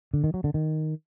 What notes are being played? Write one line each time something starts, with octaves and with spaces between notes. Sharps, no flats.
D3
D#3
F#3
D3
D#3